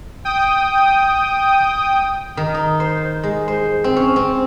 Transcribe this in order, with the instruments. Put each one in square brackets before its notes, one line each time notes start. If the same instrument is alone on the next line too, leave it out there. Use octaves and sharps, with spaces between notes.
[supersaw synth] G5 D#6
[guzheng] D#3
D#4
C5
G#3
C5
C4
C#4
C4